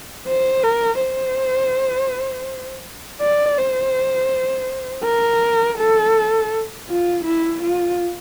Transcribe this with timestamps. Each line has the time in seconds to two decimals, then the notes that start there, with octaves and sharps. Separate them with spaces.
0.27 C5
0.64 A#4
1.01 C5
3.22 D5
3.58 C5
5.05 A#4
5.79 A4
6.88 F4
7.24 E4
7.62 F4